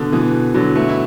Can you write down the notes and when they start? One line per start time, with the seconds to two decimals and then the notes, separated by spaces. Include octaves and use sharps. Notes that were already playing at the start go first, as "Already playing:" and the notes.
Already playing: B2 D3
0.12 B2 E3
0.54 D3 F#3
0.76 E3 A3
0.89 E4